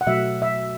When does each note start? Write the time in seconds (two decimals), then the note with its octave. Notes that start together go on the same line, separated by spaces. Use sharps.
0.01 F#5
0.07 B2 F#3 A3 E5
0.42 E5